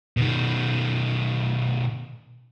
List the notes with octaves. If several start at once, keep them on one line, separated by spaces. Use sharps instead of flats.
B2 D#3